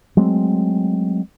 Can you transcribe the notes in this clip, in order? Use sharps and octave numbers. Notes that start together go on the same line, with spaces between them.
F#3 G#3 A3 C4